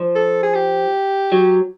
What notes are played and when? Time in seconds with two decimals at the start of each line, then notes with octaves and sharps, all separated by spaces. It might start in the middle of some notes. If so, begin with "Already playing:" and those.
Already playing: F3
0.15 A4
0.43 G#4
0.54 G4
1.32 F#3